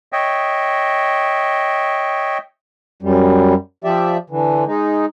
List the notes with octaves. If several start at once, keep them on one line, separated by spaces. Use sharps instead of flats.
C#5 D#5 E5 G5
F#2 G3
F3 G4 D5 E5
D3 E3
G#3 D#4